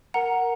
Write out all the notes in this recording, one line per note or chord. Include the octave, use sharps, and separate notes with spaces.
A#4 F#5 A#5